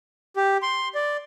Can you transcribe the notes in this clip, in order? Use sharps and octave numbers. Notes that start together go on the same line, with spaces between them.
G4
C6
D5